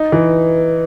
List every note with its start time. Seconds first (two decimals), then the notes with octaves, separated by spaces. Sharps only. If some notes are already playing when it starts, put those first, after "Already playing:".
Already playing: D#4
0.12 E3